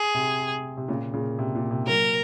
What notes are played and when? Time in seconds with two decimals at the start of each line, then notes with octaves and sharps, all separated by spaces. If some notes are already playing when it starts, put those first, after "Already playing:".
Already playing: G#4
0.14 C3
0.77 C3
0.88 A#2 C#3
1.13 A#2 C#3
1.39 C3
1.55 A#2
1.71 C3
1.87 F#3 A#3 A#4